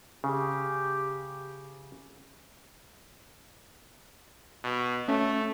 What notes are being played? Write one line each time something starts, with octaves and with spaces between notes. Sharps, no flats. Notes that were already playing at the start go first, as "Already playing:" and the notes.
C#3 G4
B2
A3 C#4